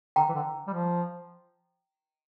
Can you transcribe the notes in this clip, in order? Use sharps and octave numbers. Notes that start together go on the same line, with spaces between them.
D3 G5 A#5
E3
D3
G3
F3